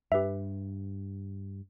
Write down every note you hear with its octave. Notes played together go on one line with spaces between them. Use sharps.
G2 G4 B4 E5